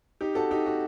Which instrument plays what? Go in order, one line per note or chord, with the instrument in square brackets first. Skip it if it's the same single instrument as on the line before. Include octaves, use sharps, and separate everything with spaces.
[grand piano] D#4 G4
F#4 A4
D#4 G4
F#4